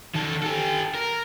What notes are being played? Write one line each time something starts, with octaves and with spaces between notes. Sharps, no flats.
D#3 A4
G4 A4
A#4